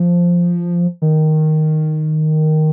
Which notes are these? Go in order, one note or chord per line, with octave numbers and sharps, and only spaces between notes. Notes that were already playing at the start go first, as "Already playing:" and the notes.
Already playing: F3
D#3